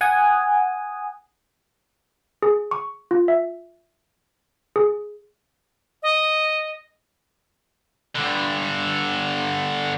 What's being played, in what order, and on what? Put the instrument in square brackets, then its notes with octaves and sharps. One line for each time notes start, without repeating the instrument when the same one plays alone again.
[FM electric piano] F#5 G#5 D#6
[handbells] G#4
C#6
F4
E5
G#4
[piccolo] D#5
[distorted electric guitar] G2 D3